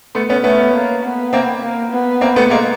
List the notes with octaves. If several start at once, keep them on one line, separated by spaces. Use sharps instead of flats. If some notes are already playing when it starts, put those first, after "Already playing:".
A3 B3
B3 C#4
A3 B3 C#4
A#3
B3
A#3 C4
A#3
B3
A#3 C4
A3 B3
G#3 A#3